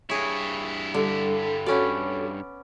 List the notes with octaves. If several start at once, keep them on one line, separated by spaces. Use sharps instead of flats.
G2 E4 G#4 C#5
D3 G3
B3 C#4 F#4 A4 C#5 D5